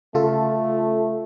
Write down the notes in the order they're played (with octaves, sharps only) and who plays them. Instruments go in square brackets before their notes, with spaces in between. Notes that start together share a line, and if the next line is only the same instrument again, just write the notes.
[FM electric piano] C#3 F4 A4 [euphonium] A3